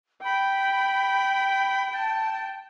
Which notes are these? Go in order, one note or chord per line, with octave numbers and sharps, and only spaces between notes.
G5 B5
A5